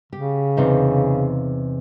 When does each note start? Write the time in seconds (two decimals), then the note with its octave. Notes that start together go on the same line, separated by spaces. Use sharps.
0.13 C#3 G4
0.57 E2 C3 D#4